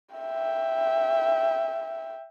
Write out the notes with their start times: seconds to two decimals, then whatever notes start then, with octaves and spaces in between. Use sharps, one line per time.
0.16 E5 G5